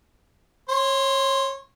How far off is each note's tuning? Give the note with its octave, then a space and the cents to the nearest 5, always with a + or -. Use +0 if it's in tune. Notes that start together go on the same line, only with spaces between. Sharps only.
C#5 -25 C6 +0